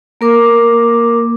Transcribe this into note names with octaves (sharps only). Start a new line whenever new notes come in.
A#3 A#4 D6